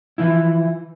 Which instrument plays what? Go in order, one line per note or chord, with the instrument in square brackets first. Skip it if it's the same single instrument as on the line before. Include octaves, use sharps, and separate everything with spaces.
[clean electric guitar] E3 F3 E4